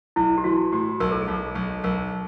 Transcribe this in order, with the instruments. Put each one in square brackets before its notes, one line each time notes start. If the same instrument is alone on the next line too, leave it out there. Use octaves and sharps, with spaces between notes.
[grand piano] B1 [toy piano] E4
[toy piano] G4
[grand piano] E3 [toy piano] F#4
[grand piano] A2 [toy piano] G4
[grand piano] B1 [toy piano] A#4
[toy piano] A4
G#4
[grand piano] B1
[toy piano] A4
[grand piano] B1
[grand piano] B1 [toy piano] A#4